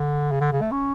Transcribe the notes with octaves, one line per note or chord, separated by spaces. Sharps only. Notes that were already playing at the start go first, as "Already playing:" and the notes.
Already playing: D3
C#3
D3
C#3
A3
C#4